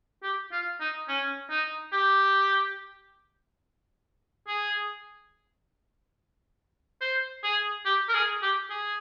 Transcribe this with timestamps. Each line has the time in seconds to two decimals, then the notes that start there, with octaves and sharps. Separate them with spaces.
0.23 G4
0.52 F4
0.80 D#4
1.09 C#4
1.50 D#4
1.93 G4
4.47 G#4
7.01 C5
7.43 G#4
7.86 G4
8.09 A#4
8.14 G#4
8.42 G4
8.70 G#4